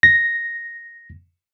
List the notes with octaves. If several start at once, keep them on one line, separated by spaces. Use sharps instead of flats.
A#6